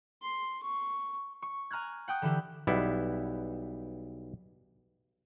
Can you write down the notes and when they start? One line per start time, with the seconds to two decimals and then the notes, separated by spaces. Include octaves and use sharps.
0.22 C6
0.63 C#6
1.42 C#6
1.71 G#5 A#5 F6 F#6 G#6
2.08 F#5 G5 D#6 F#6
2.22 D3 E3 E4 G4
2.67 B1 G3 B3 E4